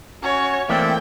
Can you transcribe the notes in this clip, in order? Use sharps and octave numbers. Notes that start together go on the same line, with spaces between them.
C#4 F#4 C#5
E3 A3 A#3 C4 D5 E5 G5